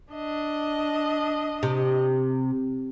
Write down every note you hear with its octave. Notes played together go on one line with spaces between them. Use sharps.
D4 D#5
C3